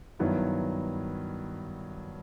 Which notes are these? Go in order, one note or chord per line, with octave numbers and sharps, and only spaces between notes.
G2 D#3 F#3 B3 E4